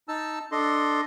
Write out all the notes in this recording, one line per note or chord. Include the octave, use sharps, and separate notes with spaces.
D#4 A5 E6
D4 A4 D#5 C6